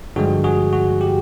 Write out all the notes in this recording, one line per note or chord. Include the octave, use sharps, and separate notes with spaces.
G2 D3 F3 G#3 F#4 G#4
F#4 G#4
F#4
G4